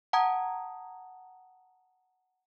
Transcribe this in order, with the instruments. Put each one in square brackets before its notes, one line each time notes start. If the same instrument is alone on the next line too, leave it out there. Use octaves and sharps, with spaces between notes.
[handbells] F#5 A5 A#5 D#6 G#6